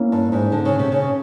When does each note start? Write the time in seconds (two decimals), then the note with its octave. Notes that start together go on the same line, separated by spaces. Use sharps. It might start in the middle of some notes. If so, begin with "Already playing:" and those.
Already playing: A#3 C#4 E4
0.12 G2
0.32 G#2
0.52 D3
0.65 C#3
0.79 C3
0.92 C#3